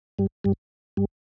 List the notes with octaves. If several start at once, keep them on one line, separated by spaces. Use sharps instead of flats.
G2 G3
G2 G3
G2 G3